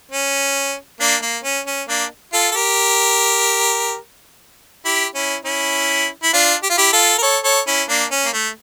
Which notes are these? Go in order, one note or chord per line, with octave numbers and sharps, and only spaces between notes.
C#4
A#3 D4
A#3
C#4
C#4
A#3 D4
F4 A4
A4
G4 A#4
E4 G4
C#4 E4
C#4 E4
E4
D4 F4
G4
F4
E4 G4
F4 A4
A#4
A4 C#5
A4 C#5
C#4 E4
A#3 D4
C#4
A#3
A3